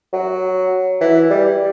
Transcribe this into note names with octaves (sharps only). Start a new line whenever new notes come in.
F#3
E3
G3